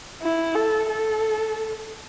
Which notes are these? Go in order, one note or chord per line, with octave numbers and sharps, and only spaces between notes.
E4
A4
A4